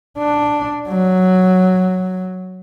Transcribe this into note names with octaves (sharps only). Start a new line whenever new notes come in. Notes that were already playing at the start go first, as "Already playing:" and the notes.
D4
F#3